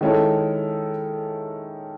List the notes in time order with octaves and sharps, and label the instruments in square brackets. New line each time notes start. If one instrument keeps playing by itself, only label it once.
[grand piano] D#3 G#3 C#4 E4 A4